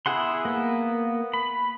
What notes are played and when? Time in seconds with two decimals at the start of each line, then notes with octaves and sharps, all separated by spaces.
0.06 B3 E4 G#4 F#5 C6
0.45 A#3 B3
1.34 B5